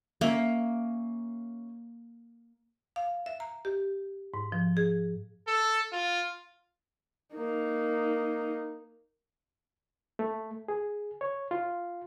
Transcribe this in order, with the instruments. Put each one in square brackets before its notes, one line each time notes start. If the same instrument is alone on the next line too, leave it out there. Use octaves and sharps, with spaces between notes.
[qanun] A#3 [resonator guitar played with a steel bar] C#4 E5
[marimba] F5
E5
A#5
G4
G#2
F3
G#4
[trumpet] A4
F4
[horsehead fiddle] A#3 D#4
[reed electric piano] A3
G#4
C#5
F4